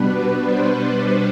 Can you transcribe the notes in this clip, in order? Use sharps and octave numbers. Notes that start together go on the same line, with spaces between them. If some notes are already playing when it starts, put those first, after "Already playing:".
Already playing: B2 G3 B3 D4 B4
C5